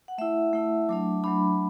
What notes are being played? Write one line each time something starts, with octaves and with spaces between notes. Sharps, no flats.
F#5
A3 E4 E5
A3 E4
F#3 A3 D4 D6
F#3 A3 D4 B5